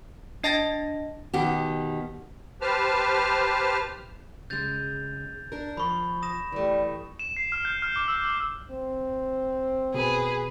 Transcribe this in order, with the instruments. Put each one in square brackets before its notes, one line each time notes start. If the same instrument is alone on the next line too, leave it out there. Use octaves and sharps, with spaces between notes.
[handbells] D4 D#5 A5 A6 A#6
[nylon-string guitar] B2 D#3 B3 G4
[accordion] G4 B4 C5 A5 F6
[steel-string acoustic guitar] C#3 G#3 [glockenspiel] G6 A6 F7
[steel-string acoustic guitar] D4 A#4
[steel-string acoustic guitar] F3 [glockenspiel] B5 C#6
[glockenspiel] D#6 A#6 E7
[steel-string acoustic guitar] E3 A3 [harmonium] G3
[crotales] E7
C7
F6
G6
F6
D6
E6
E6
[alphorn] C4
[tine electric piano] B2 [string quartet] G#4 B4